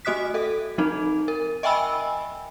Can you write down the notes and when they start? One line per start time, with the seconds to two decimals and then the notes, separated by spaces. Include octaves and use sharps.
0.05 A3 F#4 D#5 D#6 F#6 B6
0.34 A4 E5
0.78 F3 C4 D#4
1.28 A#4
1.63 D#5 E5 G5 G#5 B5 E6